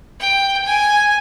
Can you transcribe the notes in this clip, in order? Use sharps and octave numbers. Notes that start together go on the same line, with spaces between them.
G5
G#5